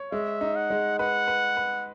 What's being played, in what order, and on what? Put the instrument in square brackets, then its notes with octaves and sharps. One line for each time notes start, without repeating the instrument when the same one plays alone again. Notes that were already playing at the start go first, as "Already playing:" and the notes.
Already playing: [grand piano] C#5
[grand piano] G#3 [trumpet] E5
[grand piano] D#4
[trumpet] F#5
[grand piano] G#3
[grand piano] B4 [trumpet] F#5
[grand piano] B4
B4